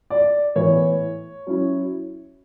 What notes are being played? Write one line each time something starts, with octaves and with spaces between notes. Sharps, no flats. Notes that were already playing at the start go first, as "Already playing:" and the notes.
D5
A2 E3 B3 C#5
F#3 C#4 E4